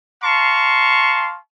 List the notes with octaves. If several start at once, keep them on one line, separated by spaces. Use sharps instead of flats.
F5 A5 A#5 C6 C#6